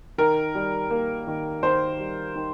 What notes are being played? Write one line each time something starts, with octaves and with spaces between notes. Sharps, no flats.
D#3 A#4
G3
A#3
D#3
D#3 C5
G3
D#3